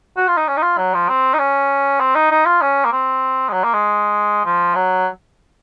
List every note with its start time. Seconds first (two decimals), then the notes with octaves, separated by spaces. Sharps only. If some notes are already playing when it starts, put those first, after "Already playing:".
0.17 F#4
0.28 F4
0.37 D#4
0.48 C#4
0.57 D#4
0.63 F4
0.78 F#3
0.94 F3
1.09 C4
1.34 D#4
1.39 C#4
2.00 C4
2.15 D#4
2.31 D#4
2.46 F4
2.62 C#4
2.85 A#3
2.92 C4
3.49 G#3
3.53 F#3
3.64 A#3
3.74 G#3
4.45 F3
4.75 F#3